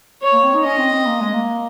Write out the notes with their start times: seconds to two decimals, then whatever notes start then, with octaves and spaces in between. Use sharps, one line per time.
0.22 C#5
0.33 A#3
0.44 C4
0.54 D#4
0.64 C#4 D#5
0.79 C4
0.93 C4
1.07 A#3
1.21 G#3
1.34 A#3